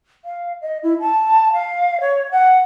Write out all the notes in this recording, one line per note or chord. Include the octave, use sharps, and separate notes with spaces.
F5
D#5
E4
A5
F5
C#5
F#5